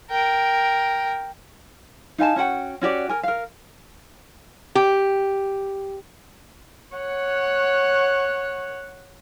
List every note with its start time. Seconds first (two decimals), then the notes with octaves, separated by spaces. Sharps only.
0.11 A#4 G5
2.18 D#4 F5 G#5 A5
2.36 C#4 F#4 F#5 G5
2.81 C#4 F#4 G4 D5
3.09 A#4 G#5
3.23 A#4 F5
4.75 G4
6.96 C#5 F#5